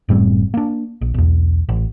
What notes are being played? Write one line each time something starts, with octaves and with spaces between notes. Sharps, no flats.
F#1 A2 G3 C4
A#3 D4
A#1
B1 E2
A1